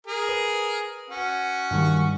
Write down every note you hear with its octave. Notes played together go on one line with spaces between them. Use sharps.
G#4 A#4
B4
C#4 F#4
G2 D#3 G3